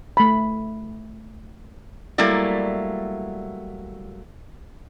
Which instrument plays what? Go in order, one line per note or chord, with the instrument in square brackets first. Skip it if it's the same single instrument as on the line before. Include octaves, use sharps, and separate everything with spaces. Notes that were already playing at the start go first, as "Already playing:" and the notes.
[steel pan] A3 B5
[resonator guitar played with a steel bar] F#3 G3 A3 A#3 E4 D5